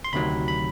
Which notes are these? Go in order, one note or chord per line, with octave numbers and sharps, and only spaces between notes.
C6
D2 C3 D#3 F#3 B5
B5